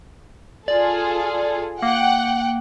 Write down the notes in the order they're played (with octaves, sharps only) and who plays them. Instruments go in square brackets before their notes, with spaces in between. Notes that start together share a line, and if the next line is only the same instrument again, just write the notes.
[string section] F4 G#4 A4 [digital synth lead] D5
[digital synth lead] A#3 [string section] F#5 G5